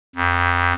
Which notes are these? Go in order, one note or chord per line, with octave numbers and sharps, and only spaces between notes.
F2